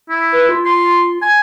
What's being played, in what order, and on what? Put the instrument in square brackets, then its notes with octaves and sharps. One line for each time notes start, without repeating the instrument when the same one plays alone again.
[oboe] E4
[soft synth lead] B4
F4
[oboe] C6
G#5